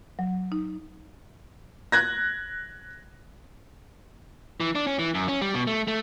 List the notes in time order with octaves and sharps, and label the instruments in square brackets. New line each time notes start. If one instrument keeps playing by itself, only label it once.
[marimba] F#3
D#4
[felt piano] F#6 G#6 A#6
[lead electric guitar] E3
D4
C#4
E3
F#2
C#4
G3
B2
A3
A3